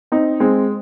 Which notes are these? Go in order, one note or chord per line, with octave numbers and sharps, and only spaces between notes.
C4 D#4
G#3 C4